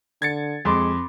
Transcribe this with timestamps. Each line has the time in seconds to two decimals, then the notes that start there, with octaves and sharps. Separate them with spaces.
0.22 D3 G#6 A6 C#7
0.65 F2 G#3 B5 C6 D6